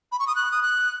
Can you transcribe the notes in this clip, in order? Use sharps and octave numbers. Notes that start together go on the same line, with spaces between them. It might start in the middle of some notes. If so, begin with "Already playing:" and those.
B5
C#6
D#6
F#6
D#6
F#6